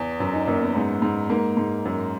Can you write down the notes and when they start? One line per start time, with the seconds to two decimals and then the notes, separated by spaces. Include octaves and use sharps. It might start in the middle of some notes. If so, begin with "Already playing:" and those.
Already playing: E2
0.20 F#2
0.33 D#4
0.47 F#2 A#3
0.62 B3
0.75 G#2
1.02 G#2
1.30 G#2 A#3
1.57 G#2
1.85 F#2